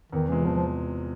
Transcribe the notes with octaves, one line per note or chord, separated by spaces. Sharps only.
E2 D#3
C3 E3 F3 G#3
E2 F3
F3